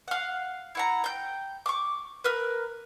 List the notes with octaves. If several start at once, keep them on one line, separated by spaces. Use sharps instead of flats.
F5 F#5
E4 F#5 A#5
G5 G6
C#6 D6
A#4 B4